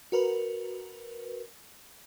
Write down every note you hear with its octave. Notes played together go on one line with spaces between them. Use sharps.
F#4 A#4 B4